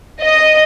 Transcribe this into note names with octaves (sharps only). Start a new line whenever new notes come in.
D#5